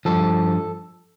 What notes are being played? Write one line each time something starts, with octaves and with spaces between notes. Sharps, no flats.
G2 F3 A4